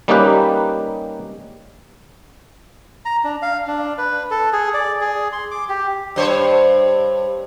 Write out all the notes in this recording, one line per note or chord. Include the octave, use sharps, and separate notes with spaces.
G3 A#3 C#4 D#4 G4 B4
A#5
D4
F5
D4
B4
A4
G#4
D5
G#4
C6
D6
G4
G2 C5 C#5